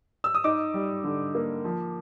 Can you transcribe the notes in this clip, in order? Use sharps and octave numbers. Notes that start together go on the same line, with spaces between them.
E6
D#6
D#4 D6
G3
D3
A#3
F3